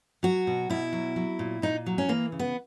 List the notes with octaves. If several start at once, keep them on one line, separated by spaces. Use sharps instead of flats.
F#3 F#4
B2
B2 E4
F#3
F#3
A#2
A#2 D#4
F#3
C#4
E3 A#3
C#3
B3